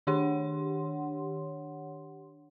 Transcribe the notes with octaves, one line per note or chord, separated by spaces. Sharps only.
D#3 D4 G4 C#5 F#5 C6